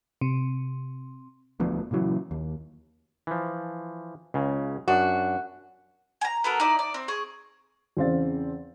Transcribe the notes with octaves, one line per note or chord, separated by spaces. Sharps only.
C3
E1 D2 F3 B3
A#2 C#3 E3 F#3
D#2
E3 F3
C#2 C#3
F#2 D4 F#4
G#5 A#5
B3 F#4 A4 A#4
D#4 E4 D5
D5
C4
G#4 C#6
E2 C#3 C4 D5 F5 A6